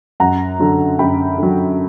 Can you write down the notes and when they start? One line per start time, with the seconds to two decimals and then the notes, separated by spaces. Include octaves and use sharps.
0.20 F#2 F#5 A#5
0.60 D3 F#3
0.99 F#2 G5 B5
1.38 D3 F#3